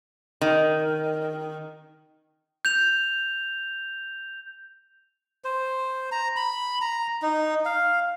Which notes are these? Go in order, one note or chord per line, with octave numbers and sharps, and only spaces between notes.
D#3
G6 F7
C5
A#5
B5
A#5
D#4
F5